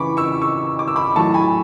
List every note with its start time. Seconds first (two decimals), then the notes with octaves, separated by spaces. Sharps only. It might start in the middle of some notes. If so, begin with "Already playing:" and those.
Already playing: C#3 E3 B5 C#6 D6
0.17 C#6 E6
0.41 C#6 E6
0.79 D6
0.87 E6
0.96 B5 D6
1.16 A2 F#3 A5 C#6
1.34 G#5 B5